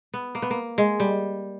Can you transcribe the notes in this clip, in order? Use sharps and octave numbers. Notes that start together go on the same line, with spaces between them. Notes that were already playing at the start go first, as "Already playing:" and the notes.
B3
A#3
B3
A#3
G#3
G3